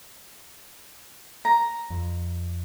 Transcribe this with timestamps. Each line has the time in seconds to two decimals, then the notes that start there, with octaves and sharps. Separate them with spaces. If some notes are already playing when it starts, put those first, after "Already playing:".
1.45 A#5
1.90 F2